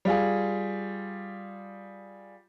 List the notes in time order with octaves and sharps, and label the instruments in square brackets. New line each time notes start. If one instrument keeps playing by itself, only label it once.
[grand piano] G3 F4 G#4